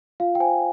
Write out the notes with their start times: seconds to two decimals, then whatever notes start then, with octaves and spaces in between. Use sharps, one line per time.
0.20 F4 F5
0.35 G5
0.40 C5 G#5